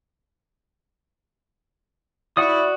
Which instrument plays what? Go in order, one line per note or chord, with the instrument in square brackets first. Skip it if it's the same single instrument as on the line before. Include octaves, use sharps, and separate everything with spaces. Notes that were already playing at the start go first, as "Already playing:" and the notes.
[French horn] E4 [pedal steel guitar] F#4 D5 D#6